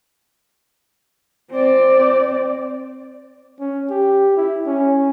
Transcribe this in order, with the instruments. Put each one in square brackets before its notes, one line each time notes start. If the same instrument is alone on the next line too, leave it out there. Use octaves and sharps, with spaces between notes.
[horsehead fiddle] C4 D5
[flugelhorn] C#4
G4
E4
C#4